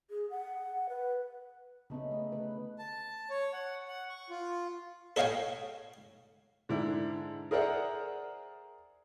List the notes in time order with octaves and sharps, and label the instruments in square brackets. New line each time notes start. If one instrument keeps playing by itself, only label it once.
[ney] G#4
F#5
B4
[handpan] C#3 B3 C#4 [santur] A3 D#4 B5
[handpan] A3 [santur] E4 B4 D#5
[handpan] D3 B4 [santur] B5
[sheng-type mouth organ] A5
C#5
F#5
F#5
C#6
F4
[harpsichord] A4 C#5 D#5 F5 G5 G#5
[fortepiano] G#2 D3 D4 E4
G#4 A#4 C5 D5 E5 F#5